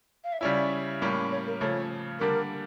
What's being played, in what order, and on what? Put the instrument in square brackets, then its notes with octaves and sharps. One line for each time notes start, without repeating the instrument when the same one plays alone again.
[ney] F5
E5
[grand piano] C#3 G3 C#4 E4 [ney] D5
[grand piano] A2 G3 A#3 C#4
[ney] C#5
A#4
[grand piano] C#3 F3 A3 [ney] C#5
[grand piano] D3 G3 A#3 D4 [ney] A#4